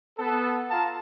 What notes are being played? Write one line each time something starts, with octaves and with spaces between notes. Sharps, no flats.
B3 A4
F4 F5 A5 A#5